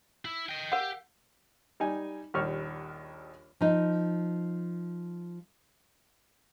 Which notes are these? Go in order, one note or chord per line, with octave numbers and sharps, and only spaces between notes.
E4
D#5 G5
G4 A#4 F5 F#5
G3 D#4 G#5
A#1 D#2 G3 C#6 F6
F3 D#4